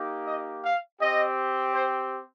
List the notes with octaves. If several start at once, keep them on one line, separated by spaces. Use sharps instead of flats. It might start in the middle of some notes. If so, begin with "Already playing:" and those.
Already playing: A#3 D#4 G4
D#5
F5
C4 G4 D#5
C5